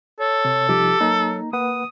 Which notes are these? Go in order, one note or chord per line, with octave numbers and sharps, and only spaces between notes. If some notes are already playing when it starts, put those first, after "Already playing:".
A4 C#5
C3
C2 F3 D#4 G4
F#3 A#3 D#4 A#5
A#3 B4 F#5 D#6